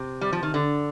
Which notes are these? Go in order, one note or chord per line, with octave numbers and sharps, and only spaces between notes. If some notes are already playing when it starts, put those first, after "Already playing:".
Already playing: C3
G3
F3
D#3
D3